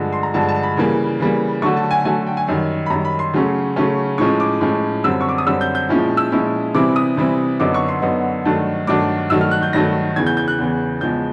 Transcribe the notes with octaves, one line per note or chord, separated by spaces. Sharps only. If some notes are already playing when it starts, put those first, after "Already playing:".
Already playing: G2 D3 F3 G#3
C6
A#5
G2 D3 F3 G#3 A5
A5
B5
C#3 E3 G3 A#3
C#3 E3 G3 A#3
D3 F#3 A3 C#6
A5
G#5
D3 F#3 A3 G#5
G5
G#5
F#2 D#3 G3
B5
F#2 D#3 G3 A#5
B5
C6
C#3 F#3 A3 C#4
C#3 F#3 A3 C#4
A2 F3 G#3 C#4 C#6
D6
A2 F3 G#3 C#4
F#2 D3 G3 C4 E6
C#6
D6
D#6
F#2 D3 G3 C4 E6
G6
G6
A#2 F3 G#3 C#4 E4
E6
A#2 F3 G#3 C#4 E4
C3 E3 G3 C4 E4 D6
D#6
C3 E3 G3 C4 E4
F#2 D3 F#3 B3 D#4 D6
C#6
C6
F#2 D3 F#3 B3 D#4
G2 D#3 F#3 A3 D4
G2 D#3 F#3 A3 D4 D6
G2 D#3 F#3 A3 E6
F6
F#6
G6
G2 D#3 F#3 A3 A#6
E2 C#3 E3 G#6
G6
G6
F#6
E2 C#3 E3
E2 C#3 F3 G#3 G6